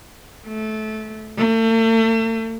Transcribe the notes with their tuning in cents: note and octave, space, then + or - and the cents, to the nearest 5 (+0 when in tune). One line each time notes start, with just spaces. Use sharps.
A3 -20
A3 +40